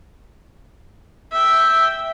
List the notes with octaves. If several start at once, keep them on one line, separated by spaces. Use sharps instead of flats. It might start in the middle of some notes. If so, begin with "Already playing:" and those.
E5 G5